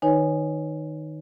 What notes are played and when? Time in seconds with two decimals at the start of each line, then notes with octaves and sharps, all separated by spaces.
0.02 D#3 D#4 B4 C#5 G#5